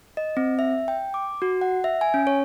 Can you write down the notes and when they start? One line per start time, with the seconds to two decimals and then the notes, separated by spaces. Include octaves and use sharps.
0.17 D#5
0.37 C4
0.59 E5
0.88 G5
1.14 D6
1.42 F#4
1.61 F#5
1.84 E5
2.01 G#5
2.14 C#4
2.27 C#5